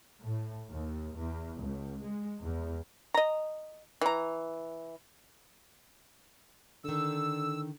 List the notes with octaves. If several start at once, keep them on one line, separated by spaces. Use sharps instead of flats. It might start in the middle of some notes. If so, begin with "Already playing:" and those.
A2
D#2
E2
C#2
G#3
E2
D#5 A#5
E3 A#5
D3 D#3 A4 E6